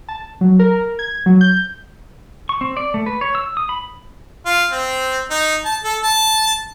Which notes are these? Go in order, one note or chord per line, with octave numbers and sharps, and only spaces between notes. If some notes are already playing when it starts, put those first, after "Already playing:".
A5
F#3
A#4
G#6
F#3
G6
C#6
C4
D5
A3
B4
C#5
E6
D#6
B5
F4
C4
D#4
A5
A4
A5